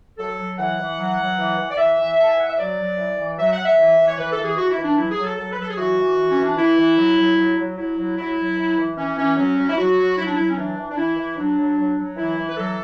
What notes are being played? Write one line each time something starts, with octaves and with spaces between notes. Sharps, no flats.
F#3 A4
F#3
E3 F#5
E3
F#3
F#3
E3
E3
D5
E3 E5
E3
E3 A5
G#5
E3 F#5
E5
F#3 D5
F#3
E3
E3
F#3 E5
F#5
F#3
E5
E3
E3
C#5
E3 B4
A4
E3
G#4
E3 F#4
E4
E3
D4
F#3 E4
G#4
F#3
A4
F#3 A4
B4
F#3 A4
G#4
E3 F#4
E3
E3
C#4
E3
D4
E3 E4
E3
F#3
F#3
F#3
F#3
F#3 E4
F#3
F#3 E4
F#3
E3
E3
E3 C#4
E3 C#4
F#3 C#4
F#3
E4
F#3 F#4
F#3
F#3 E4
D4
F#3 E4
C#4
E3 D4
E3
D4
E3 E4
E3
F#3 D4
F#3
F#3
F#3
E3 E4
E3
B4
F#3 A4